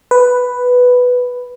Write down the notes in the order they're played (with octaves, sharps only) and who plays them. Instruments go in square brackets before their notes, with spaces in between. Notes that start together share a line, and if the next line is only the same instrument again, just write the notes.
[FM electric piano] B4